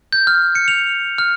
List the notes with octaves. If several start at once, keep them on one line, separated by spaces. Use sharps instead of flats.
G6
F6
C#7
F7
F6